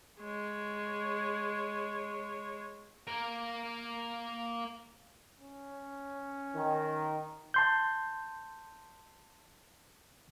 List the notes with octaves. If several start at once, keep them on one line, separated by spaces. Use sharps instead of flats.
G#3 C#5
A#3 A#4
C#4
D#3
A5 C6 G6